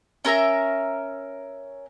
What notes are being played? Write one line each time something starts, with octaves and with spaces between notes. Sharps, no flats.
C#4 A#4 E5 A#5